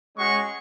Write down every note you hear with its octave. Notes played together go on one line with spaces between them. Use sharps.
G#3 C#4 F#4 C#6